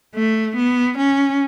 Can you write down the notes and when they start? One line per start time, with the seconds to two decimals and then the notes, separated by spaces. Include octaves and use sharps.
0.15 A3
0.56 B3
0.98 C#4